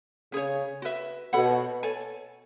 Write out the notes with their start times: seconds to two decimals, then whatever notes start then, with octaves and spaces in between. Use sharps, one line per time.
0.32 C#3 C#4 G#4 C#5
0.82 F#4 B4 E5
1.33 B2 A4 C#5 F#5 B5
1.83 A4 C#5 G#5